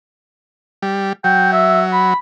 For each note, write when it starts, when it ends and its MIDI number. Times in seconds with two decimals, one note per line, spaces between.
0.82 1.13 55
1.24 2.14 54
1.24 1.52 79
1.52 1.81 76
1.93 2.16 83